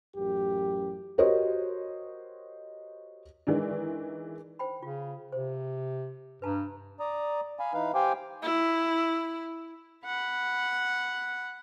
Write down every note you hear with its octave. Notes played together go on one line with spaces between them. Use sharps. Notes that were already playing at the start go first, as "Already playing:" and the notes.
A1 F#2 G4
F#4 G4 A#4 C5 C#5 D#5
D#3 E3 G#3 D4
C5 G5 B5
C#3 F4
C3 C5
G2 B4 A5 A#5
D5 A#5 D#6
F5 G#5 B5
E3 D#4 B4 F5
G4 C5 F5 G5 G#5 D6
E4
F#5 B5